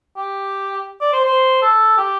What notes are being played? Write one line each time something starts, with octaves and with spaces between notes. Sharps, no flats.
G4
D5
C5
C5
A4
G4